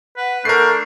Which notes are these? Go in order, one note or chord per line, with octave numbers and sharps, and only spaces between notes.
B4 F#5
A3 D4 A#4 C#6 G6 C7